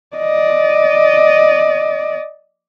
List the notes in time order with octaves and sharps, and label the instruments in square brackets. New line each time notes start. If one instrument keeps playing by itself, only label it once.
[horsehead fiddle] D5 D#5